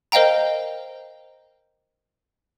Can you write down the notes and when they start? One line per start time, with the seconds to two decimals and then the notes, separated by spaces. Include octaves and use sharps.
0.12 A#4 C5 D#5 F5 G5 A#5